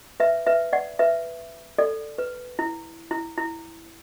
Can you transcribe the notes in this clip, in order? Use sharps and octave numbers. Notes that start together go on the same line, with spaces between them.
B4 E5
B4 E5
D5 F#5
B4 E5
A4 D5
B4
E4
E4
E4